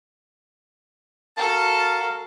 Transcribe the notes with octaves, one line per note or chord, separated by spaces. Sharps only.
F#4 A4 A#4 F5 A5